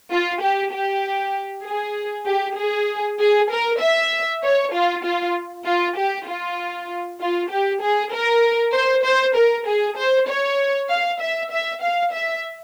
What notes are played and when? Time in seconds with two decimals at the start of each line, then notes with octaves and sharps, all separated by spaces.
0.11 F4
0.41 G4
0.72 G4
1.65 G#4
2.26 G4
2.57 G#4
3.19 G#4
3.50 A#4
3.80 E5
4.43 C#5
4.73 F4
5.04 F4
5.66 F4
5.97 G4
6.27 F4
7.20 F4
7.50 G4
7.81 G#4
8.12 A#4
8.73 C5
9.04 C5
9.36 A#4
9.66 G#4
9.97 C5
10.28 C#5
10.89 F5
11.20 E5
11.51 E5
11.81 F5
12.12 E5